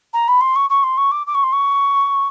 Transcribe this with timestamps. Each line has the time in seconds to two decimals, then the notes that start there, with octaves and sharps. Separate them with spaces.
0.13 A#5
0.28 B5
0.41 C6
0.56 C#6
0.70 C#6
0.83 C6
0.97 C#6
1.11 D6
1.27 D6
1.34 C#6
1.43 C6
1.52 C#6